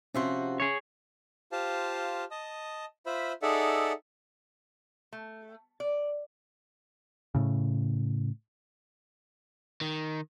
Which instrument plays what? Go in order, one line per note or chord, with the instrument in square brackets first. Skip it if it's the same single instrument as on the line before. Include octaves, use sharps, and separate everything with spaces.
[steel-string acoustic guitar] C3 F3 F#4 [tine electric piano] C#4 E5 C6
[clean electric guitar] G#4 C#5
[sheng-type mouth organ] F4 G4 C5 F5 A5
D#5 A5 D#6
F4 C5 E5 B5
D#4 G#4 A4 D5 E5 F#5
[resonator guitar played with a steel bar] A3
D5
[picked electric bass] A2 C#3
[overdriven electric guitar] D#3